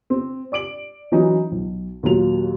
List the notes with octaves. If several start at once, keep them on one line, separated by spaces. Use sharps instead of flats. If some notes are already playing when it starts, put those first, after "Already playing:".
C4
D5 D6 D7 F#7
E3 F#3 C#4 D#4
B1
D#2 A#2 F#3 F7